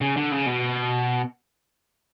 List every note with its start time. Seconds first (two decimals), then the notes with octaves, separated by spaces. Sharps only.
0.01 C#3
0.17 D3
0.32 C#3
0.46 B2